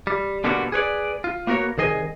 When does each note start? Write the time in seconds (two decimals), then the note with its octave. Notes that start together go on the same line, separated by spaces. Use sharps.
0.07 G3
0.44 B2 D3 G3 A#3 B3 F#4
0.72 G#4 B4 C#5 D5
1.24 F4
1.47 A#3 B3 F#4 A#4 C#5
1.78 C2 D#3 G#4 D#5 G#5